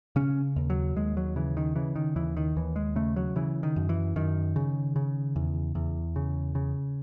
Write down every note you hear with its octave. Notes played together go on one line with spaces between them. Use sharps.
C#3 C#4
D#2
F#3
D#2 G#3
F#3
C#3 E3
D#3
C#3 E3
D#3
D#2 E3
D#3
D#2 E3
G#3
C#3 A3
F#3
C#3 E3
D#3
F#2
E3
F#2 D#3
C#3
C#3
E2
E2
C#3
C#3